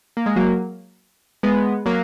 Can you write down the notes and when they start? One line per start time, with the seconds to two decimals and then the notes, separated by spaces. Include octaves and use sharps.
0.17 A#3
0.26 G#3
0.36 F#3 A#3
1.43 G#3 B3
1.86 F#3 A#3